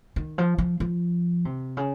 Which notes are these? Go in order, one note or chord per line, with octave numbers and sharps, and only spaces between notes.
D#3
F3
F3
F3
C3
C#3